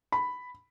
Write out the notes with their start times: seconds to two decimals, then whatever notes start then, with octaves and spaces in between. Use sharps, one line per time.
0.12 B5